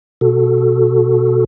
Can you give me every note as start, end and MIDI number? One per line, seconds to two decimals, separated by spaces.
0.21 1.45 47
0.21 1.45 66
0.21 1.45 69